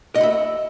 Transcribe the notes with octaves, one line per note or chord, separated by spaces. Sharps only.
D#5 E5 F#5 B5